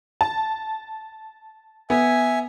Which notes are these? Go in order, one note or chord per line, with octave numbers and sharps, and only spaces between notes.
A5
B3 E5 G#5